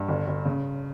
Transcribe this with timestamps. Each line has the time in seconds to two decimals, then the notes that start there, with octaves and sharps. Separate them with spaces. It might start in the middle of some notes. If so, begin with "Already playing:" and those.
Already playing: G2
0.08 G1
0.27 G1
0.45 C#3